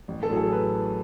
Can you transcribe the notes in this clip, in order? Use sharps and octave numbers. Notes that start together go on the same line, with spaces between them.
A1
A4
A2 F#3 G#4
A4
B4